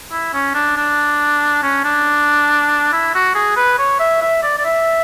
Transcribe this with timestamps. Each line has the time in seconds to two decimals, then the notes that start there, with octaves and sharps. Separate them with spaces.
0.12 E4
0.33 C#4
0.55 D4
0.77 D4
1.63 C#4
1.85 D4
2.93 E4
3.14 F#4
3.35 G#4
3.57 B4
3.79 C#5
4.00 E5
4.22 E5
4.43 D5
4.58 D5
4.65 E5